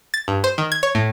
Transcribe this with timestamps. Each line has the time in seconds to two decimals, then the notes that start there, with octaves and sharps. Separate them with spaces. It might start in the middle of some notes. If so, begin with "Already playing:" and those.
0.14 A6
0.28 G2
0.44 C5
0.58 D#3
0.72 G#6
0.83 C#5
0.95 A2